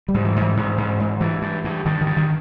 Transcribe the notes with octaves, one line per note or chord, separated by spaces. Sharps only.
G3
G#2
E3
G#2
E3
G#2
G#2
G#2
G2 E3
G2
G2
G2 D#3
D#3
G2
D#3